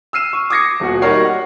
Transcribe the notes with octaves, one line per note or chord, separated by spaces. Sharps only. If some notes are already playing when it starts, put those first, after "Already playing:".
E6 F6 C7 D#7 E7
C#6
D6 D#6 G#6 A#6 C7 C#7
D#1 B2 F#4
G3 D#4 F#4 A#4 C#5 C7
F#5